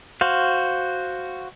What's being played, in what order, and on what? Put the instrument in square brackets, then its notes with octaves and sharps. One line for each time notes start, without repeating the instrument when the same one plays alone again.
[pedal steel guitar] F#4 C5 F5